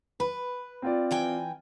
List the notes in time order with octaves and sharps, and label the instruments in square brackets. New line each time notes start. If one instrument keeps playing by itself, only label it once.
[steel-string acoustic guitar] B4 [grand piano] B5
[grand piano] C4 F4 D5
[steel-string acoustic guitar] E3 G5 G#5